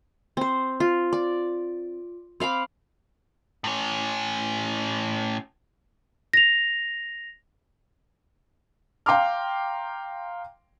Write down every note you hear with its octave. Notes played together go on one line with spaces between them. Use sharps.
C4 C5
F4
D5
C4 F5 B5 D6
A2 C#4
A#6 F7
F5 G5 A#5 C6 D6 F6